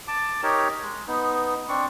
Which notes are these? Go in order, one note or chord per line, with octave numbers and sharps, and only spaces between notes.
A5 D6
D#4 G4 A#4 C#5
G#3
B3 D#4
C4 D4 C#6